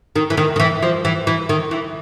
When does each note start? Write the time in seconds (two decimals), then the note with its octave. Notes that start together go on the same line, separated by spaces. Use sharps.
0.16 D#3
0.30 E3
0.37 D#3
0.56 D#3
0.60 E3
0.83 F3
1.05 E3
1.27 E3
1.49 D#3
1.71 E3